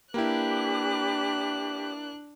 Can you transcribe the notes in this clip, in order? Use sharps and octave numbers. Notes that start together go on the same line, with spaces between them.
A#3 D4 E4 G4 B4 D6 F#6